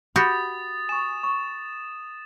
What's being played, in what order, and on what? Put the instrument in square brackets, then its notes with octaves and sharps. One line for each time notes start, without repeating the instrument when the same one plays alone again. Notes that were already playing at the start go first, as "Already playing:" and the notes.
[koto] F#4 G4 [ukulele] B5 [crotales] D#6 A6
[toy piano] G#5 C#6 [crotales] E7
[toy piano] C#6